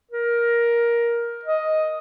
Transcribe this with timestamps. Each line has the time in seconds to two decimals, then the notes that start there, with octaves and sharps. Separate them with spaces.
0.11 A#4
1.45 D#5